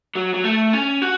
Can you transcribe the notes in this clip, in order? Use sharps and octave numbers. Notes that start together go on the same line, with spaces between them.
F#3
F#3
A3
C#4
F#4